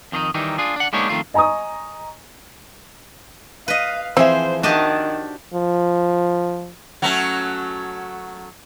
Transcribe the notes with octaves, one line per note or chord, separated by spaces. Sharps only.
F2 D#3 D4 D#4
D#3 E3 G3 D#4
D4 F4 G#4
D4 F#5
G#3 A#3 B3 D4 D#4 C#5
F2 D#3 A3 F4
D#5 G#5 A#5 C#6 D#6
B4 D#5 F5
E3 F3 C4 G#4 C5 E5
D#3 D4 F#4 G4 D#5 F5 A5
F3
F#3 A3 C#4